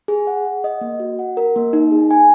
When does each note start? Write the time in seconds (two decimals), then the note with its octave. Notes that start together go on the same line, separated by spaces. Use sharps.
0.08 G#4
0.27 F#5
0.45 F#5
0.64 D#5
0.81 A#3
1.00 F#4
1.19 F#5
1.37 A#4
1.56 A#3
1.73 D#4
1.91 G#4
2.11 G#5